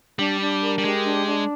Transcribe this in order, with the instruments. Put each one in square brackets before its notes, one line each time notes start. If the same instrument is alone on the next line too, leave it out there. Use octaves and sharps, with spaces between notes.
[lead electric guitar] G3 [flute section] D4
[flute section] D4
A#4
[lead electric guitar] G3
[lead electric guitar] G#3 [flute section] G4
[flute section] D4
D4